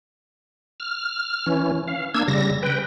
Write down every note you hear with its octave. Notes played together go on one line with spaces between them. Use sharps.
F6
E3 C#4
F5
A#3 D4 E6 G#6
C#3 G3 A#6
B4 G5